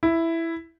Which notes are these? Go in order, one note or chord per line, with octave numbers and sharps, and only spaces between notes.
E4